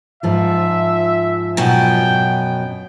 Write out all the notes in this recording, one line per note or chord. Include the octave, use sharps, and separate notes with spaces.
G#2 F3 F4 E5
F#2 B2 G5